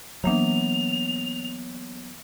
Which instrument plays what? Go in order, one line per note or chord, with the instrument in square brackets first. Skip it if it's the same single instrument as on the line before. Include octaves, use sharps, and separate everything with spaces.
[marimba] E3 A#3 D4 [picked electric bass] F#3 B3 [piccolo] F7